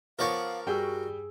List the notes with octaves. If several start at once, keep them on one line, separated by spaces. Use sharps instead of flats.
F3 B3 A#4 C#5 D5 F5 C#6
G2 G3 F#4 G#4 G5 E6